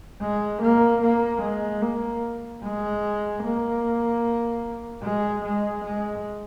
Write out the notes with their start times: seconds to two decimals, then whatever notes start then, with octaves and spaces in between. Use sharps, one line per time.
0.21 G#3
0.62 A#3
1.02 A#3
1.42 G#3
1.81 A#3
2.63 G#3
3.43 A#3
5.02 G#3
5.44 G#3
5.84 G#3